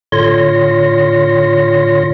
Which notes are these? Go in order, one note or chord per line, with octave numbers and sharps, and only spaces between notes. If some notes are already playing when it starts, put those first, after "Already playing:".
A2 D3 F4 C#5 C6 A#6